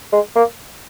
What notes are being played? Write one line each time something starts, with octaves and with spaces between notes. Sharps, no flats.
G#3
A#3